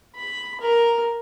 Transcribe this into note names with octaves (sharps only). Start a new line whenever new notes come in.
B5
A#4